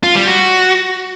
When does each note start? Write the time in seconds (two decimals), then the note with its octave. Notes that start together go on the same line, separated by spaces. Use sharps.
0.03 F4
0.15 G3
0.27 F#4